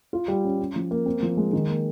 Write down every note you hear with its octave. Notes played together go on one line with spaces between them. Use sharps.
F4
G3
C#4
C#4
F3
A#3
C4
F3
G#3
D#3
A#3